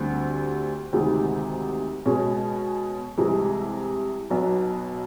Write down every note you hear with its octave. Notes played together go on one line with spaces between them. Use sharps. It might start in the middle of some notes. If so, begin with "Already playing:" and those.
Already playing: D2 D3 G3 C4
D2 C3 D#3 G#3
B2 G#3 C#4
C2 C3 E3 G#3
B1 B2 F#3 B3